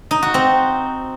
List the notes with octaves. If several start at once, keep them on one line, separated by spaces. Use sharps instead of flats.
D#4
F#4
C4